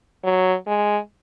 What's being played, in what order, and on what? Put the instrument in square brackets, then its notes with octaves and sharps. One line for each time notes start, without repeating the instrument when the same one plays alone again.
[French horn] F#3
G#3